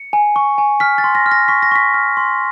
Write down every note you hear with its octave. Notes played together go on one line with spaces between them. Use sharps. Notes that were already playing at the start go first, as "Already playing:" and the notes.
Already playing: C#7
G#5
C#6
G#5
F6 B6
A6
C6
A#6
F6
A#6
C#6 B6
A#6
C#6 B6
F6
C6